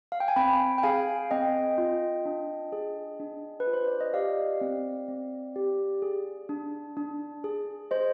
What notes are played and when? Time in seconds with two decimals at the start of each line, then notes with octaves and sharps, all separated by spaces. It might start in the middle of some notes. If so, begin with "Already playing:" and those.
0.12 F5
0.20 G5
0.28 G#5
0.36 C4 G5 B5
0.78 G5
0.83 G#4 F5 G#5
1.31 C4 D#5 G5
1.78 F4
2.25 D4
2.72 G#4
3.20 D4
3.60 B4
3.67 F4
3.73 C5
3.87 D5
4.01 D#5
4.14 G4 D5 F5
4.61 C4
5.08 C4
5.56 G4
6.02 G#4
6.49 D4
6.97 D4
7.44 G#4
7.91 G#4 C5 D#5